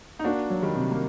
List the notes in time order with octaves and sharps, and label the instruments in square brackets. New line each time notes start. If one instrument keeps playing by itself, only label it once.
[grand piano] D#4
[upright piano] A#3 [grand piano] D4 F#4
[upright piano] F#3
[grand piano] D#3 G3
[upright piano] C3
[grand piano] A#3